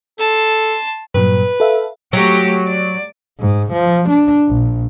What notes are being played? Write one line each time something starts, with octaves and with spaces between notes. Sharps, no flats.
A4 A5 C6
G2 A#2 F#3 B4
A4 E5 F5
F#3 A3 G4
D5
G#2
F3
D4
A#1